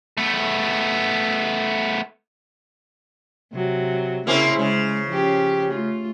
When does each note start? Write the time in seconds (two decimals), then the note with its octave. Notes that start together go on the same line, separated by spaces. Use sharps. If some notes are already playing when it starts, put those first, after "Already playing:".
0.18 A3 B3
3.53 C3 F#3
4.27 C#3 A#3 C4 C#4 E4 G#4
4.59 C#3 G#3
5.09 F3 C#4 G4
5.72 A3 F4